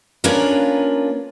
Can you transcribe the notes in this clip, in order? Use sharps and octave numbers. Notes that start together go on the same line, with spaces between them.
A#3 C#4 D4 F4 A#4 B4